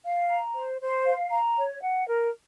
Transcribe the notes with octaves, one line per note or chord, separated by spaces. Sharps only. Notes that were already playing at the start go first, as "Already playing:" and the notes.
F5
A#5
C5
C5
F5
A#5
C#5
F#5
A#4